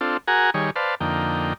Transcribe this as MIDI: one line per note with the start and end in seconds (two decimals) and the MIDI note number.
0.01 0.17 60
0.01 0.17 62
0.01 0.17 65
0.01 0.17 69
0.28 0.50 66
0.28 0.50 68
0.28 0.50 70
0.28 0.50 78
0.28 0.50 80
0.28 0.50 82
0.54 0.70 51
0.54 0.70 55
0.54 0.70 68
0.54 0.70 73
0.76 0.95 71
0.76 0.95 72
0.76 0.95 74
0.76 0.95 77
0.76 0.95 81
1.00 1.53 41
1.00 1.53 50
1.00 1.53 58
1.00 1.53 63
1.00 1.53 79